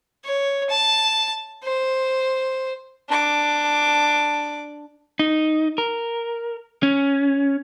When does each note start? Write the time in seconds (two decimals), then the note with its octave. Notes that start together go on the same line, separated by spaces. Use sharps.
0.25 C#5
0.70 A5
1.64 C5
3.09 D4 D6
5.19 D#4
5.78 A#4
6.83 C#4